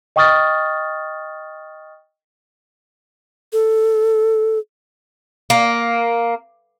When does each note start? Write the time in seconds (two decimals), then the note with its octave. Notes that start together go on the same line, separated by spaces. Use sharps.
0.16 D#5 G5 C#6 D#6 F6 A6
3.53 A4
5.50 A#3